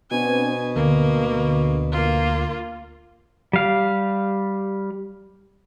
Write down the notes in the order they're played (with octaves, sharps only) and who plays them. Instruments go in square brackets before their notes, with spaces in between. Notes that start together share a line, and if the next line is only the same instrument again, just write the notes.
[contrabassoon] B2 [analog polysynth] B3 C4 D4 [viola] G#5
[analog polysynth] D2 D3 [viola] A#3
[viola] A#3 F4
[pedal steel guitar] G3 F5